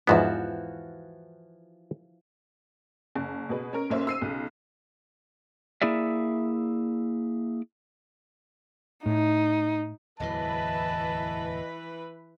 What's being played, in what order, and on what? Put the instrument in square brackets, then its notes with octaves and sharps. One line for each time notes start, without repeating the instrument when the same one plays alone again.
[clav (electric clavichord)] E2 G#2 B3 [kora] E3 F3 F#4
[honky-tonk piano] F#1
B2 G#4 B4
C#4 A#4
B1 A#3 C#4 C5 E5
E6 C7 D#7
B1 C#3
[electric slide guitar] A#3 E4 G#4 D5 E5
[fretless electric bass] A2 [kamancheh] D#4
[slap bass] D1 E2 F#3 [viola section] E3 B4 B5 [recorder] D#5 [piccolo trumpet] A5